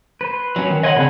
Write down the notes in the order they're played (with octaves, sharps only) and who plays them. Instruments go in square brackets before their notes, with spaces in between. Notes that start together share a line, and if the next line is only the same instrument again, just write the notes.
[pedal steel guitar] B4 C5
[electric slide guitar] F#3 C#4
D#3
[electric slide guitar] C#5 F#5 [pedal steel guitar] D#5 G#5 C6
[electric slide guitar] C#3 C4 D4 [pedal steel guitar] B5 F#6